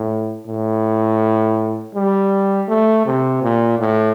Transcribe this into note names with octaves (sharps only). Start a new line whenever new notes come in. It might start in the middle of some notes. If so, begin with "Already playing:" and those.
Already playing: A2
A2
G3
A3
C3
A#2
A2